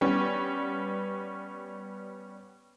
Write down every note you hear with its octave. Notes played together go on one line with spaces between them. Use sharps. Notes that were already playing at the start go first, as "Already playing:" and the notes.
G3 B3 C#4